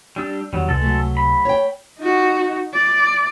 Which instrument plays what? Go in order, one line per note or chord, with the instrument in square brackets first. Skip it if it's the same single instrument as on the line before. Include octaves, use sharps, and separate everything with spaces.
[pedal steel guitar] G3 D4 E6
[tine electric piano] E2 D#3 [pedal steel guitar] F#3 G3
[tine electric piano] C#2 C3 [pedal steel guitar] G#3 A4
[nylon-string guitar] F#3 A3
[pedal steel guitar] B5
[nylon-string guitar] C#5 G5
[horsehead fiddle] D#4 F#4
D5